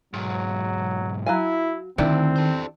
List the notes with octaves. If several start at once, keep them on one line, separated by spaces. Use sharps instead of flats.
B1 G#2 F#3
F#3 E4 F5 G#5
D2 D#3 C4 D4 E4 G4
A4 C5